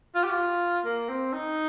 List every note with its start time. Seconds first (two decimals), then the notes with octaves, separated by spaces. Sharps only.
0.15 F4
0.23 G4
0.31 F4
0.85 A#3
1.09 C4
1.33 D#4